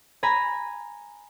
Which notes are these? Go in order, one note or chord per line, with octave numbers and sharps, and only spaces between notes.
G#5 A#5 B5